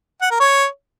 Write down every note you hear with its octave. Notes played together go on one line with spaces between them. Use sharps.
F#5
A#4
C#5